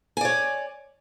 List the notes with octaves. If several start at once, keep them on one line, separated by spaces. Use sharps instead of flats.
C#5 D5 G#5